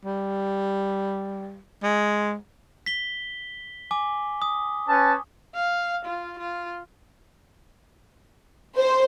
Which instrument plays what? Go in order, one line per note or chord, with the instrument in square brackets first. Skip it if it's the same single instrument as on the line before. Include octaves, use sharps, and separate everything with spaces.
[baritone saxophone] G3
G#3
[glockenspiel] B6 G7
G#5 D6
D#6
[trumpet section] C#4 B4 A5
[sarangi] F5
F4
F4
[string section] C5